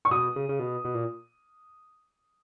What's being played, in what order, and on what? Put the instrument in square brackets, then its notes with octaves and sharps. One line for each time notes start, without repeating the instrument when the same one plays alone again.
[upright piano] C#6
[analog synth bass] B2 [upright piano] D#6
[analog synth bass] C#3
C#3
B2
B2
A#2